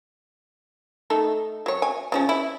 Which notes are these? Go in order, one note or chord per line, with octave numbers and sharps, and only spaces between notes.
A3 D#4 A4
F#3 C#5
G#5
C#3 F3 C#4
E4